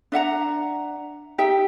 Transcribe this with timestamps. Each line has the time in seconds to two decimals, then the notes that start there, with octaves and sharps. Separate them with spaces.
0.12 D4 E5 F#5 A#5
1.38 D#4 G4 E5 G5